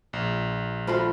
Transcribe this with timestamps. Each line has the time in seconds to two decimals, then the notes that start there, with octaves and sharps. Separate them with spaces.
0.13 A#1
0.87 F3 A3 F4 F#4 B5